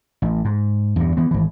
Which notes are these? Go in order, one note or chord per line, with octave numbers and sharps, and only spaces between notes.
A1
G#2
E2 G2
E3 B3
G#1 E3